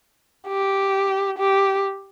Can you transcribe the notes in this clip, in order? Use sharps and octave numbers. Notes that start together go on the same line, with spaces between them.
G4
G4